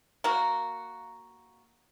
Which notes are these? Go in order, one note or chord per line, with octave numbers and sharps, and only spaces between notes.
A#3 F#4